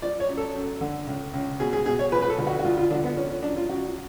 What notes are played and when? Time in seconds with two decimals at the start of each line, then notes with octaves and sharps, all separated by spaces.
0.02 F3 D5
0.20 C#5
0.29 F#2
0.37 A4
0.55 F#2
0.81 D3
1.07 C#2
1.33 C#2
1.60 B2 G#4
1.73 G#4
1.86 B2 G#4
1.99 C#5
2.12 F3 B4
2.22 B4
2.30 A4
2.38 D2
2.47 F#4
2.59 F#4
2.65 D2 F4
2.77 F4
2.91 D3 D4
3.04 B3
3.17 F3 C#4
3.30 C#4
3.43 F#2 D4
3.57 F4
3.69 F#2 F#4